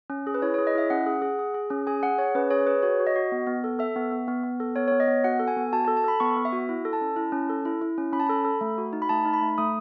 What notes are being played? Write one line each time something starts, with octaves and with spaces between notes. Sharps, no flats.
C#4
G#4
B4
E4 C#5
C#5
G#4
D#5
E4 E5
C#4 F#5
G#4
G#4
G#4
G#4
C#4
G#4 G#5
G#4 F#5
G#4 C#5
C#4 B4
G#4 C#5
G#4 B4
F#4 C#5
F#4
D#5
F#4
B3
B3
A4
A4 E5
B3
B3
B3
B3
A4
B3 C#5
C#5
B3
D#5
B3
F#4 F#5
A4
G#5
B3
F#4 A5
A4 A5
A5
A4 B5
B3 C#6
B3
E5
F#4
E4
A4
A5
C#4
E4
C#4
A4
E4
E4
C#4
C#4 B5
A5
A4 B5
A4
A3
F#4
D#4
B5
A3 A5
D#4
B5
A3
A3 D#6